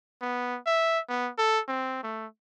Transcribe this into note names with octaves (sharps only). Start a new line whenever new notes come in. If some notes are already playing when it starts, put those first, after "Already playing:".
B3
E5
B3
A4
C4
A3